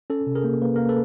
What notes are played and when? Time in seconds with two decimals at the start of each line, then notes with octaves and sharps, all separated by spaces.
0.10 C#4 A4
0.27 C3
0.35 G#4 A#4
0.44 A#3
0.62 A#3 B4
0.76 A#3 A#4
0.89 A4 B4